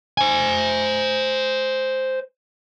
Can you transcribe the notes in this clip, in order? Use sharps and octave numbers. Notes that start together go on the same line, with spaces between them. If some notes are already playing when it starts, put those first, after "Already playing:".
C5 G#5